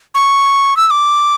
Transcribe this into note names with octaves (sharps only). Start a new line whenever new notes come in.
C#6
E6
E6
D6